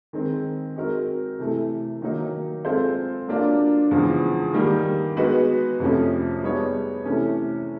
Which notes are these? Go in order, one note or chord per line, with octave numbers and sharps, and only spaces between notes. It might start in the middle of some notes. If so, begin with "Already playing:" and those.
D#3 G#3 C4
G#3 C4 D#4 F#4 A#4
C3 E3 A3
D#3 F#3 A#3 D#4
G#3 C4 F4 A4 C5
F#3 A#3 D4 F4
E2 C#3 F3 G#3
D#3 G3 A#3
G#3 B3 D#4 F#4 B4
F2 C3 F3 A3 C#4
G3 B3 D#4 G#4 C#5
C3 E3 A3 C#4